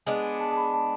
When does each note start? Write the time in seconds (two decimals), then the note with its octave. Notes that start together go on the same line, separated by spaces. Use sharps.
0.06 G#3 B3 D4 G#5
0.23 G#5
0.40 A5
0.52 A5
0.57 B5
0.74 A5